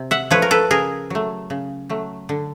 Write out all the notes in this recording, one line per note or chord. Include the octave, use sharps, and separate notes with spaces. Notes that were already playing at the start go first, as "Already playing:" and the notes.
Already playing: C3
E5 F#5
F3 A3 B4 C#5
A#4
A4 B4
C#3 G#4 A#4
F#3 A3
C#3
F#3 A3
D3